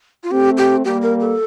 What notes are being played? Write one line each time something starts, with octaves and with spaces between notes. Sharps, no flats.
F4
A3 C4 G4
G4
G3 A#3 G4
A#4
A4